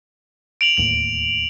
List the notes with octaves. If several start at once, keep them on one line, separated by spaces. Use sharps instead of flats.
D7 F7 F#7
D1 D#2 A2 F#7